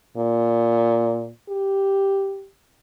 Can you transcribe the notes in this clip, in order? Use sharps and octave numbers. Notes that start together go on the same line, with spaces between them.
A#2
G4